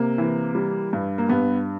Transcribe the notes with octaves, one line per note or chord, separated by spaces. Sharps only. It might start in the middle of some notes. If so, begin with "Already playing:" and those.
Already playing: C3 A#3
E3
G3
G2
A#3
G2 B3